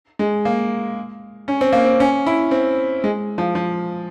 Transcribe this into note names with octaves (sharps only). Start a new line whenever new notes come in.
G#3
A#3
C#4
C4
A#3
C4
C#4
E4
C4
G#3
F3
F3